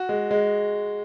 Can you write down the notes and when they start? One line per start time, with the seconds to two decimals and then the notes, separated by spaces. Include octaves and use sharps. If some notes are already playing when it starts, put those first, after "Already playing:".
Already playing: F#4
0.09 G#3
0.31 G#3